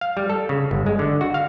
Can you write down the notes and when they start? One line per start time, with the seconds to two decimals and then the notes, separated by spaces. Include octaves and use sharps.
0.01 F5
0.17 G3
0.29 A4
0.49 C#3
0.71 G1
0.86 G#3
0.99 D3
1.21 F#4
1.34 F5